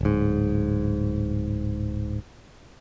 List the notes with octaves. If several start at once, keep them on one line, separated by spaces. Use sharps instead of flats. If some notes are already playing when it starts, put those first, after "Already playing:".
D1 G#2